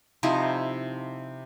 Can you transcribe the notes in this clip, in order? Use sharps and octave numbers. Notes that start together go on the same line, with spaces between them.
C3 F3 D#4 E4